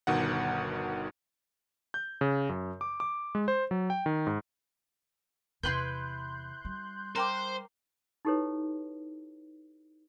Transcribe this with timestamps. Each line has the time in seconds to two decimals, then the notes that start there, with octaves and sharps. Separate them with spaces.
0.07 G1 B2 D#3 F#5
1.94 G6
2.21 C#3
2.49 F#2
2.81 D6
3.00 D6
3.35 G#3
3.48 C5
3.71 F#3
3.90 G5
4.06 D#3
4.27 G#2
5.63 E2 C3 E4 F4 B4 C6 F#6 G6
6.65 G3
7.16 A#4 C5 G5 D6
8.25 D#4 E4 G4 A4 B4 C#5